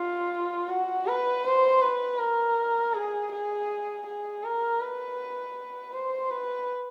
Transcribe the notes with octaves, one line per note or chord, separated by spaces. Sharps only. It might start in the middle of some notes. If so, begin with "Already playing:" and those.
Already playing: F4
F#4
B4
C5
B4
A#4
G#4
G#4
G#4
A#4
B4
C5
B4